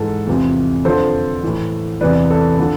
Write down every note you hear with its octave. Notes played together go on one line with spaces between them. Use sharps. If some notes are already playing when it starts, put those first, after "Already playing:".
Already playing: G#2 E3 A4
E2 C3 F3
F2 D3 F3 A4 C5
A2 E3
E2 C3 E3 B4 D5
A4
D3 F3